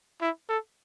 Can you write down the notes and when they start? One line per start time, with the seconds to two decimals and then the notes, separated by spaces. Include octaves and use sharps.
0.21 E4
0.49 A4